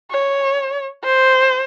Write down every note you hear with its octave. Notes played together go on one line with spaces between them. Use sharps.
C#5
C5